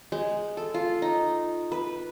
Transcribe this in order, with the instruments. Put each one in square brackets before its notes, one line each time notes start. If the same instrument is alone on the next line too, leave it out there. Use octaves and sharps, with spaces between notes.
[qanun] G#3
A4
F4
D#4
B4